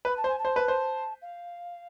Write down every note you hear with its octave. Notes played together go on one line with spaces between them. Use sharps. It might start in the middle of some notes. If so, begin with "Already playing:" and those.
B4 B5
A5
C5
G#5
A5
C5
B4
C5
F5